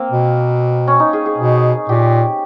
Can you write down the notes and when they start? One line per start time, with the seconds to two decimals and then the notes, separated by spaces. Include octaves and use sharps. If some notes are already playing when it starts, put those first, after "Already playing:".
Already playing: A#3 C4
0.12 B2
0.87 C#4
1.00 D#4
1.13 G#4
1.26 G#4
1.38 B2
1.89 A#2 G4